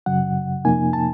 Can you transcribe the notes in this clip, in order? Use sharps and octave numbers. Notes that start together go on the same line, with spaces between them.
F#2 C#3 F#3 F#5
F2 C3 F3 A#3 D#4 G#5
A5